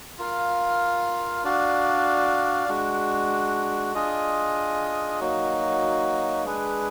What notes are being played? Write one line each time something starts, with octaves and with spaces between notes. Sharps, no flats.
F4 A#4 F5
D4 F#4 D5 F5
G#3 D4 F#4
D4 F4 G#4 D#5
F#3 A#3 D#4 F#4
G#3 D4 G#4 B4